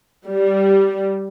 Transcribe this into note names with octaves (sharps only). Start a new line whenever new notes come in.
G3